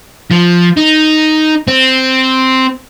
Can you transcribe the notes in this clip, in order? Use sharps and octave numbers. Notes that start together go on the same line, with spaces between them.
F3
D#4
C4